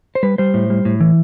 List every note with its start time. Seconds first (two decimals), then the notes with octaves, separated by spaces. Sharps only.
0.15 C5
0.23 G3 B4
0.38 G3 C5
0.54 A2
0.70 G3
0.85 A2
1.00 E3